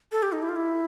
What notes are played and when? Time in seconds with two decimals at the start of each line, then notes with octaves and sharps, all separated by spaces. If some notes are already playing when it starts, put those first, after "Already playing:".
0.12 A4
0.23 G4
0.32 D#4
0.42 E4
0.49 F4
0.56 E4